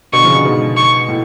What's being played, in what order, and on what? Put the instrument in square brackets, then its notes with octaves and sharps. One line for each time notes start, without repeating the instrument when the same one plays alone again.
[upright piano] B2 D3 [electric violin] C#6
[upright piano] C#3 F3
B2 D3
G#2 B2
[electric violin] C#6
[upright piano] A2